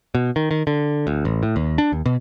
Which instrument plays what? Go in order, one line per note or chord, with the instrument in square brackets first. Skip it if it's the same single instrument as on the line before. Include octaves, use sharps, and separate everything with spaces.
[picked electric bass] B2
D#3
D#3
D3
D2
A1
A2
D#2
D4
D#2
B2